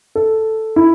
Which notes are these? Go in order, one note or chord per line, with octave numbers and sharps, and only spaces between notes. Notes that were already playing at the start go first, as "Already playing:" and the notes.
A4
E4